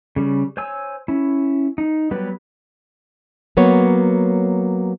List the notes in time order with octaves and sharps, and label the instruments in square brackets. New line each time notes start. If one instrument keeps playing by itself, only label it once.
[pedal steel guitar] C#3 G3
C5 C#5 G#5 E6
C#4 E4
D#4
F#3 G3 B3 G4 B4
[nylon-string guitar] F#3 A#3 B3 C#5